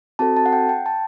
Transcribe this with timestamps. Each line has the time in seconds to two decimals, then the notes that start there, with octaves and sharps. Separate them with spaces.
0.19 C4 F#4 A4 A5
0.37 A5
0.46 F#5
0.53 G5
0.69 G5
0.86 A5